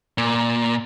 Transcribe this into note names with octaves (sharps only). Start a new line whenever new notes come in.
A#2